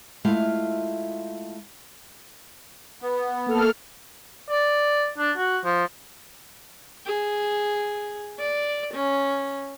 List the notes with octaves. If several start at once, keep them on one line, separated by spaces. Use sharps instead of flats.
G#3 A3 E4 F4 E5 F5
B3
A#3 A4 F6
D5
D4
F#4
F3
G#4
D5
C#4